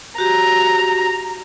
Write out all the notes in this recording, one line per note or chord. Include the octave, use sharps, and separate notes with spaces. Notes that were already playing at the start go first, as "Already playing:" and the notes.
F#4 G4 A#5